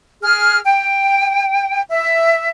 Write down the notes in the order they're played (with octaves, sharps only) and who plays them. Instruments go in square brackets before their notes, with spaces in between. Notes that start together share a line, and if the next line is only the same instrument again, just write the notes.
[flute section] G#4 F6
G5
E5